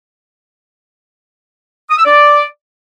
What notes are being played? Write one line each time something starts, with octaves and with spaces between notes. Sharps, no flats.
D#6
E6
D5